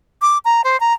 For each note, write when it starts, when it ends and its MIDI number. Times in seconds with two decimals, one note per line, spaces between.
0.22 0.38 86
0.45 0.62 82
0.64 0.79 72
0.80 0.93 82